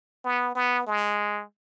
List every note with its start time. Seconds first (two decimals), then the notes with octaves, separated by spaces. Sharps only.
0.24 B3
0.55 B3
0.87 G#3